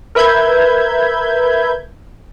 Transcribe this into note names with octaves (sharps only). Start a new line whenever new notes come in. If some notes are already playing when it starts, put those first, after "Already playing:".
A#4 B4 E5 B5 G6 G#6